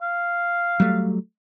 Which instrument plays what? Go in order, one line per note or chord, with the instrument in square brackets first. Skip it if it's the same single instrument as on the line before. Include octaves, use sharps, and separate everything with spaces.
[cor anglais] F5
[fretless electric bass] F#3 G3 A3